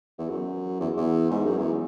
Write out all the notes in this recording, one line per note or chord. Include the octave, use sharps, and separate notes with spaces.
E2
F#2
E2
E2
G#2
F#2
E2